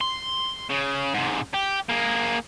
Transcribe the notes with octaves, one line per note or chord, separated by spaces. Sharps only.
C6
C#3
G#2 C3
G4
A#3 G#4